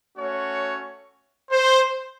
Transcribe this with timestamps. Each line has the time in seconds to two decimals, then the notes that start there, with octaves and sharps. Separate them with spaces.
0.17 A3 C#4 F#4 C#5
1.51 C5